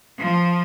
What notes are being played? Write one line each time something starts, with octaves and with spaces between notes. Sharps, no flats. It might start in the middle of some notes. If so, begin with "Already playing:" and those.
F3